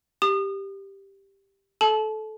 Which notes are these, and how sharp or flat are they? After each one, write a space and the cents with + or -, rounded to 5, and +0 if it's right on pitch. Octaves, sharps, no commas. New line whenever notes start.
G4 +0 D#6 -35
A4 -20 A5 -30